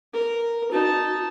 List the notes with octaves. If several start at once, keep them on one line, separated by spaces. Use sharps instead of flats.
A#4
D#4 F#4 A5